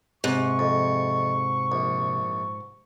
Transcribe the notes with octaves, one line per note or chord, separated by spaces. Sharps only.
G#2 C3 C#6
F2
A#1